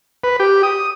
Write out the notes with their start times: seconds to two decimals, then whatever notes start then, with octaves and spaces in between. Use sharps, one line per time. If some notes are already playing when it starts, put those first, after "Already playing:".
0.24 B4
0.40 G4
0.63 D#6